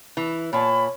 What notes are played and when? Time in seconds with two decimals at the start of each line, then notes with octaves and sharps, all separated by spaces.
0.17 E3
0.53 A#2 C#5 A5 B5